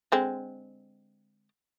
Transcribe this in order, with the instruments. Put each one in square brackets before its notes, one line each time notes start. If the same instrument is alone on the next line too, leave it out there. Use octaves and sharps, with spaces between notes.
[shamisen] D3 G#3 C4